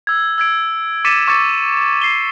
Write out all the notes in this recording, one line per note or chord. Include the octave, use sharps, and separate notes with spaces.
E6 G#6
E6 G#6 D7
D6 A6 B6 C#7 D#7 E7
C#6 D6 E6 A6 C#7
C7 G7